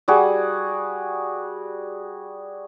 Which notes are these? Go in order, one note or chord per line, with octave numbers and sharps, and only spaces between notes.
G3 F#4 G#4